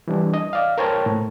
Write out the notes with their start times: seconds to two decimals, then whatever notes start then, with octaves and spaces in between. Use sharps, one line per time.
0.08 E3 G3 D4
0.34 D#5
0.53 D5 F5
0.78 A#4 C5 C#5 G5 A5 A#5
1.06 A2